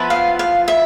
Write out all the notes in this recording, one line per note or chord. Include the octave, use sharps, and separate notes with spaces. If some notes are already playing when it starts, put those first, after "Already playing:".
Already playing: F3 B3 E4 B4
F5
F5
E5